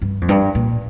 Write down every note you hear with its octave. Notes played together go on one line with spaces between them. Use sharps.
G2
F2
G2
A#2